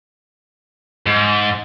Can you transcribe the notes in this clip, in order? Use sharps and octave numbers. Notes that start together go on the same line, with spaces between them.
G#2